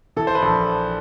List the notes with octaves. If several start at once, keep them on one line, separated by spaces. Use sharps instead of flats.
E3 A4
C5
B4
A#1